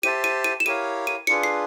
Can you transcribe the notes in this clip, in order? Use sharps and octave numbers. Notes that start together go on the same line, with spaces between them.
G4 C5 E5 A5 D#7
D#7
D#7
E7
E4 G4 A#4 C#5 F5 D#7
D#7
D4 F4 G#4 B4 C#7
C7